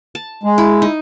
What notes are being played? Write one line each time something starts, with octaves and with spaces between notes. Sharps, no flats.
A5
G#3
E4
D#4